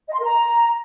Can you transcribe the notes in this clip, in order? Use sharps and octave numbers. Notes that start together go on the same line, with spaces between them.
D#5
C6
A#4
A#5